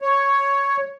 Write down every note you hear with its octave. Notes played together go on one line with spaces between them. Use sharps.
C#5